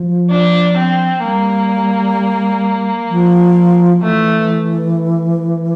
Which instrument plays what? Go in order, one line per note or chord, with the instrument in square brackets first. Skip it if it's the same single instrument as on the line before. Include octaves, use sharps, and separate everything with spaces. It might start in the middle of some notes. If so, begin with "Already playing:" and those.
Already playing: [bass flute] F3
[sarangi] D4
C4
[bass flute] G3 [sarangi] A#3
[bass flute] F3
[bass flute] E3 [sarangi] A3